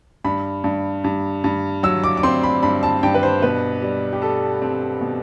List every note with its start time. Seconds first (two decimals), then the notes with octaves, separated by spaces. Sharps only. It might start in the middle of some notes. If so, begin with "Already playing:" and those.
0.24 G2 B5
0.64 G2
1.04 G2
1.44 G2
1.83 F#3 E6
2.04 D6
2.17 D6
2.23 C4 C6
2.43 B5
2.63 G2 B5
2.83 A5
3.03 G2 G5
3.14 B4
3.23 C5
3.42 B2 B4
3.82 G3
4.13 G4
4.22 G3 A4
4.62 C4
5.01 B2